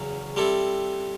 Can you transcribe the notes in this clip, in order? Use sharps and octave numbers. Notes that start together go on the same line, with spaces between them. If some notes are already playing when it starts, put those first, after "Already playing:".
Already playing: E2 C#3 F#3
G3 C4 E4 A4